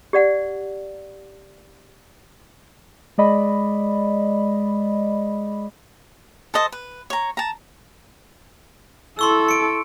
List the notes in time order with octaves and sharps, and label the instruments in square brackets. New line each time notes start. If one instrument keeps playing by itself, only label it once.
[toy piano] G4 D5 F#5
[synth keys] G#3 D5 D#5 B5
[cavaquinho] A4 C5 D#5 A5
B4
C#5 A#5
A5 A#5
[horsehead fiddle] E4 A4 [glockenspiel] C6 C#6 E6
[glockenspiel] C#7 D7